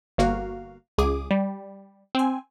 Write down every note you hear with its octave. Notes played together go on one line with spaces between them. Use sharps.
G1 A#3 F#4 F5
C#2 G#4 D6 D#6
G3
C4 G#5